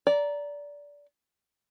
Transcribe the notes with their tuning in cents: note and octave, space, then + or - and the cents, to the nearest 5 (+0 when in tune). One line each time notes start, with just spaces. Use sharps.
D5 -20 A#5 +0